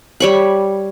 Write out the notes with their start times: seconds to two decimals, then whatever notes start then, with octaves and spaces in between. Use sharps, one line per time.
0.20 G3 C#5 B5